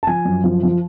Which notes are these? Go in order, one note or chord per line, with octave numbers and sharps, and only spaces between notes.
A5
F3 G#5
F#2
F3
F3